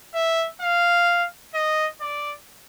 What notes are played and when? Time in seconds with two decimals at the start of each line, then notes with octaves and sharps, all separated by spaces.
0.15 E5
0.61 F5
1.54 D#5
2.01 D5